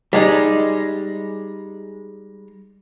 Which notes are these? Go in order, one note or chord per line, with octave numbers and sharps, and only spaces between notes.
G3 G#3 D#4